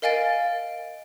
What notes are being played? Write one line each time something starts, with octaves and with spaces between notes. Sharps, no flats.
A#4 D#5 F5 G#5 A6 D7